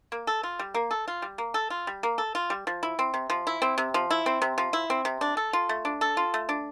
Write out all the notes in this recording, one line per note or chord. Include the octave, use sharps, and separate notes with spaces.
A#3
A4
F4
G3
A#3
A4
F4
G3
A#3
A4
F4
G3
A#3
A4
F4
G3
F3
E4
C4
C3
F3
E4
C4
C3
F3
E4
C4
C3
F3
E4
C4
C3
D4
A4
F4
A3
D4
A4
F4
A3
D4